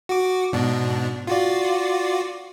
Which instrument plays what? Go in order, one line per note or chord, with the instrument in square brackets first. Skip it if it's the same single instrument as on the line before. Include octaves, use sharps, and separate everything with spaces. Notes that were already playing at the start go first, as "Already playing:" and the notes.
[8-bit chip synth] F#4 D6
G#2 B2 D4
F4 F#4 D5